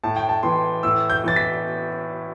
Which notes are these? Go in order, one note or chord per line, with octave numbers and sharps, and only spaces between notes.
A2 A5
G5
A5
E3 C6
A2 E6
G6
E3 A6
B6